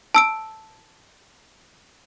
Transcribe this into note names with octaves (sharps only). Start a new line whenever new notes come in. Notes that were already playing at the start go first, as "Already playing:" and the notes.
A5 E6 D7